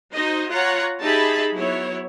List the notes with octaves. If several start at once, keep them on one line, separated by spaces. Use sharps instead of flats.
D#4 F#4 C5 D#5
F4 C#5 F#5 A#5
D#4 G4 G#4 E5 A5 B5
F#3 B3 E4 C#5